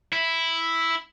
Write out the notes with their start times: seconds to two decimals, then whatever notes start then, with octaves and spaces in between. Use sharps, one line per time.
0.12 E4